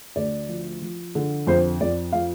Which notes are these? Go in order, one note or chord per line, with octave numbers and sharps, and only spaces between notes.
D2 D5
F3
F3
D3
F2 C5
F2 D5
F3 F5